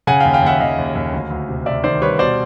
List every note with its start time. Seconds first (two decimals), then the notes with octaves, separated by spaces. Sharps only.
0.07 C#3 F#5 G#5
0.20 F5 G5
0.25 D#2
0.33 F5 G5
0.42 D#2 E5 F#5
0.60 D#2 D#5 F5
0.78 D#2
0.95 D#2
1.13 D2
1.30 D2
1.49 C3
1.66 C3 D5 E5
1.84 D#3 C5 D5
2.01 G3 B4 C#5
2.19 B2 C5 D5